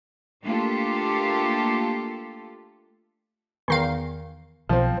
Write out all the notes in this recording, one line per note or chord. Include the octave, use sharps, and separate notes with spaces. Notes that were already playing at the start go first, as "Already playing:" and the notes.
A3 A#3 D4 F4 G4 A4
E2 D#3 F5
B1 F3 C4